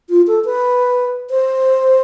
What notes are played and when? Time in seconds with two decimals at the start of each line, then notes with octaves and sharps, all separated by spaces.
0.10 F4
0.27 A4
0.45 B4
1.30 C5